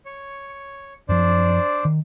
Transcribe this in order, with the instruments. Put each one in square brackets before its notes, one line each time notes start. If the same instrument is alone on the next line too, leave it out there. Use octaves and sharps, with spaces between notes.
[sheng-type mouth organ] C#5
[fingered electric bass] F#2 F3 [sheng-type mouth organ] D4 C5 D5
[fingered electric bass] D#3